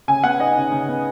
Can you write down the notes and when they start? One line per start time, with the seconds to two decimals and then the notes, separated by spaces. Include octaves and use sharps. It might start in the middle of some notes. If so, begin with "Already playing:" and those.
0.08 C#3 G#5
0.24 B3 F#5
0.40 D#4 D#5
0.56 C#3
0.72 C#3
0.88 B3